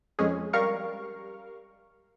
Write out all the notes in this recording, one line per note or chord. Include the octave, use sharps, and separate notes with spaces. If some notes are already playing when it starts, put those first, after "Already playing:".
F2 G#3 C#4 G#4
G3 A#4 F5 C#6 F6